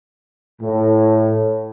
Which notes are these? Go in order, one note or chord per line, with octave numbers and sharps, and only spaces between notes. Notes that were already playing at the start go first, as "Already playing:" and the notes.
A2